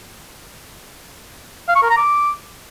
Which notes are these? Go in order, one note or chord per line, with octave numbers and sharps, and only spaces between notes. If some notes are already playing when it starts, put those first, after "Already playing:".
F5
C#6
A#4
A#5
D6